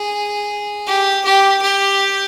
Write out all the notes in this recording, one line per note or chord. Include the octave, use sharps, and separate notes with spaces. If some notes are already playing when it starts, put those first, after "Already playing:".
Already playing: G#4
G4
G4
G4